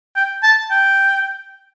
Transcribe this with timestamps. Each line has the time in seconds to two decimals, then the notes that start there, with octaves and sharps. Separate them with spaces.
0.16 G5
0.43 A5
0.71 G5